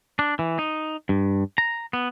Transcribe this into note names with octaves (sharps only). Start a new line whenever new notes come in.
D4
E3
D#4
G2
A#5
B3